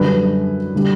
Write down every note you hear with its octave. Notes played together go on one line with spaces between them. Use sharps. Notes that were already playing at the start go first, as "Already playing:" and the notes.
Already playing: F#2 D3 G3 B4
D3 G3